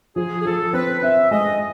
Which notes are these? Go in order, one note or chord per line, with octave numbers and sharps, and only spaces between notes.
F3 G#4
G#4
F3 A4
C4 B4
C4 E5
G#3 D#5